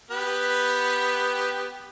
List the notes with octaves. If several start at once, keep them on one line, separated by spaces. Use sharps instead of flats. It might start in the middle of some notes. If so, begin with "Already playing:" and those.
B3 G4 B4